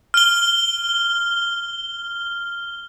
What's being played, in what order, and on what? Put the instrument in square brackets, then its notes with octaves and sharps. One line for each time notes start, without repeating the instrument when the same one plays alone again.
[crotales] F6 G7